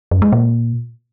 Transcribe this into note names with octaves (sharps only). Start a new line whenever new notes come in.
F#2
G#3
A#2